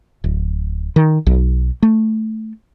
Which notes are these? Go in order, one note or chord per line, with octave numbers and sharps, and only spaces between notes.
D1
D#3
B1
A3